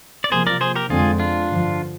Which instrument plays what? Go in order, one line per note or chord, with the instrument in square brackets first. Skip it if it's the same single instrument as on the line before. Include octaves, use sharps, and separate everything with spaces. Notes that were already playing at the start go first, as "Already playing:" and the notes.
[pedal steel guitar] D5
[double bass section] C3 F3 A#3 [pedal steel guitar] G#4 C5
[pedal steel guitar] A#4 D5
G#4 C5
G4 A#4
[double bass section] F2 D3 G#3 C4 [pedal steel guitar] F4 G#4
[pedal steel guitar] D4 F4
[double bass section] G2 D3 F3